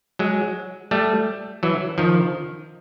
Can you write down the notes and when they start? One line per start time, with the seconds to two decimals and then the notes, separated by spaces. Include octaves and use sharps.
0.19 F#3 G#3
0.91 G3 A3
1.63 E3 F#3
1.98 D#3 F3